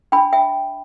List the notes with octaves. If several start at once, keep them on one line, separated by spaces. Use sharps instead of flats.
D4 G5 B5
E5 G5